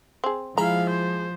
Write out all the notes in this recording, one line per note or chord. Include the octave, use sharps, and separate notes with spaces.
C4 G#4
F3 G#3 E4 F5 A#5 B5
C5